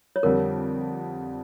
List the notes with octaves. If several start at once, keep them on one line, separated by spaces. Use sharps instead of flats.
C#5
F2 D3 G3 A#4